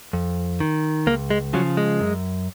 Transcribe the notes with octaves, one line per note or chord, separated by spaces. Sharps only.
F2
D#3
C#2 A#3
G#3
C#3 F3 F#3
G#3
F#2